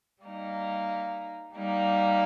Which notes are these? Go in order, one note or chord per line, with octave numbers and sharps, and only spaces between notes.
G3 A#3 D#4
G3 A#3 D#4